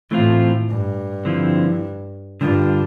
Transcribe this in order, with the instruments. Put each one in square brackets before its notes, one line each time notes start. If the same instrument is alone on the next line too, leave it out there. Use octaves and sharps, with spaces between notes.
[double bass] A2 [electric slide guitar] E3 A3 C4 F4
[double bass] G2
[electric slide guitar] D3 F3 C4 E4
[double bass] G2 [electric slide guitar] D3 G3 D4 F4